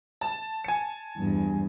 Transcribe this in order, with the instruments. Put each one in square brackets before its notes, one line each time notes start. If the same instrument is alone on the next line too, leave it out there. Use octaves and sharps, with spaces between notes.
[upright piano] A5
[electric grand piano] G#5 C#7
[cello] E2 G2